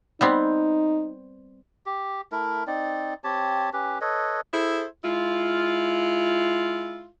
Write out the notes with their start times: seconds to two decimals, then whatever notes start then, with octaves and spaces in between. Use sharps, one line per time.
0.21 G3 B3 C4 D#4
1.86 G4
2.32 A3 E4 A#4
2.67 C4 D#4 D5
3.24 C4 G4 C#5 A5
3.73 C#4 G4 B4
4.01 A4 B4 C#5 D#5
4.53 E4 G#4 A4 C5
5.05 G#3 E4 F4